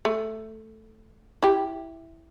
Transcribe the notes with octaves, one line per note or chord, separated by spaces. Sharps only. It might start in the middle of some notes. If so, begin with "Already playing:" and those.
A3
E4 G4